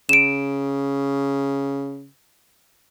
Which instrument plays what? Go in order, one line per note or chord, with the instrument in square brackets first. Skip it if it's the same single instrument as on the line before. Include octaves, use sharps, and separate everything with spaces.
[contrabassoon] C#3 [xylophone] D7 E7